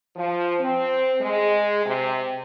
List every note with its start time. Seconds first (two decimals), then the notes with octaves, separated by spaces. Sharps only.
0.16 F3
0.60 C4
1.20 G#3
1.84 C3